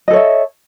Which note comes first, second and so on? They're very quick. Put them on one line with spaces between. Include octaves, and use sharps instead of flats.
D#5 A4 C#5 E5